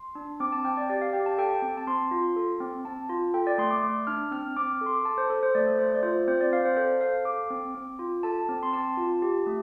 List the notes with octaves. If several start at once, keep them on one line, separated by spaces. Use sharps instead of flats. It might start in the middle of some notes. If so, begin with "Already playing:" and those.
Already playing: C6
D4
C4 D6
A5
C4 G5
D5
G4 D5
F5
G4 G5
A5
A4 G5
C4
A5
C4 C6
F4
A4
C4
C4 A5
F4
A4 G5
D5
A3 C6
D6
A3 D6
D4 F6
C4 F6
C4 D6
A4 C6
D6
A4 A5
C5
A4
C5
A3 D5
A4
A3 C5
D5
F4 C5
C4 C5
D5
C4 F5
C5
A4 C5
A4 F5
A4 D6
C4
C4
F4
A4 A5
C4
C6
C4 A5
F4
G4
A3